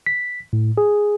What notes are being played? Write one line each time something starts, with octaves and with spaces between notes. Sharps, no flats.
B6
A2
G#4